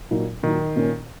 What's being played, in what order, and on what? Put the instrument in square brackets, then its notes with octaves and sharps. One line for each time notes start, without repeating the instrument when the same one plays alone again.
[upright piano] A#2 F#3 D#4
[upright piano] A#2 F#3 D#4 [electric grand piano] D#3
[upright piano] A#2 A#3 C#4